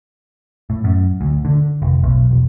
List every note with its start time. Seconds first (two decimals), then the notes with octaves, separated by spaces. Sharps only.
0.70 A2
0.84 F#2
1.21 D2
1.45 D3
1.82 F1
2.04 B1
2.31 E1